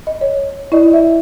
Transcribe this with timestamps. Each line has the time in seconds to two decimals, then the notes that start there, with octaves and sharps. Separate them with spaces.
0.07 D#5
0.21 C#5
0.72 E4 D5 D#5
0.93 E5